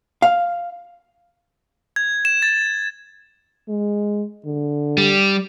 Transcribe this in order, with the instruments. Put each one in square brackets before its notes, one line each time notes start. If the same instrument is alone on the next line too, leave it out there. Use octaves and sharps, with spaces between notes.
[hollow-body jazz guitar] F5
[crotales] G#6
E7
A6
[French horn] G#3
D3
[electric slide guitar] G3